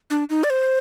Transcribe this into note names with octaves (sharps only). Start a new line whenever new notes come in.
D4
D#4
D5
C5